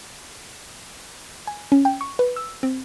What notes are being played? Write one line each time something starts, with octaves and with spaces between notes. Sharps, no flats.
G#5
C#4
G5
C#6
B4
E6
C4